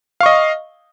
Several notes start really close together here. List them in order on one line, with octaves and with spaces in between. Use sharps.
F5 C#6 D#5